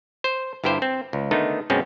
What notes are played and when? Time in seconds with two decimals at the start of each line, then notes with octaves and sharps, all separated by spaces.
0.24 C5
0.64 G1 G2 E4 G4 C5
0.82 C4
1.13 C#2
1.31 D3 D#3 A3 B3 D#4
1.70 F#2 B2 G#3 C4 C#4